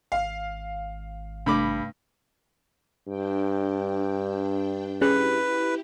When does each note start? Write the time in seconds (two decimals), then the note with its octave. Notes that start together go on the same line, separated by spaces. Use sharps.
0.12 G#1 F5
1.46 G2 C3 A3 D4 B5 D6
3.08 G2 D4 G5
5.01 C#4 E4 G4 G#4 B4 F#6